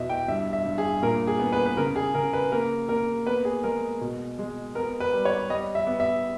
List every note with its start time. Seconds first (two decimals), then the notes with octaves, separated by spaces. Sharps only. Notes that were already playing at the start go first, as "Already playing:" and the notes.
Already playing: E2 B2 D#5 E5
0.10 G5
0.28 G2 E5
0.53 E5
0.66 G2
0.78 G#4
1.02 A#2 A#4
1.27 G#4
1.40 B3
1.52 B4
1.66 B4
1.77 C#3 A#4
1.96 G#4
2.14 C#3 A#4
2.33 B4
2.52 A#3 A#4
2.89 A#3 A#4
3.26 B3 B4
3.45 G#4
3.63 G#3 A#4
4.01 B2
4.39 G#3
4.75 B3 A#4
5.00 B4
5.13 G3
5.25 C#5
5.50 G3 D#5
5.75 E5
5.87 B3
6.00 E5